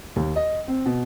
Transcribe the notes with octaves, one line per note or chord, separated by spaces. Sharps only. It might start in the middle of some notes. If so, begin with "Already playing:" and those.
D#2
D#5
C4
B2